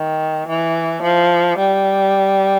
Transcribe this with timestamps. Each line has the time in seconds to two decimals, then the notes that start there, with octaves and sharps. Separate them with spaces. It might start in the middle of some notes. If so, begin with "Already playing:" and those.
Already playing: D#3
0.48 E3
1.03 F3
1.58 G3